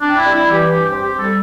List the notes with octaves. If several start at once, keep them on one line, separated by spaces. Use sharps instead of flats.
C4 D4
E4
G3
E4
E3
G4
G2 G4
G4
C4
G4
G3
A4